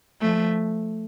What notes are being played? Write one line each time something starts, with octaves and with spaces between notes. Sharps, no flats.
F3 A3